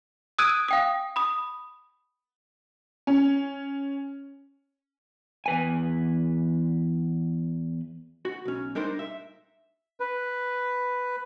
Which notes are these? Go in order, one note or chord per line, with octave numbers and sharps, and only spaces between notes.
D#6 E6 F#6 G#6 D7 D#7
F5 G5 D#6
B5 D#6
C#4
E2 B4 G#5
F#4
B1 C#4
G3 D4 D#4 A#4 C5
E5
B4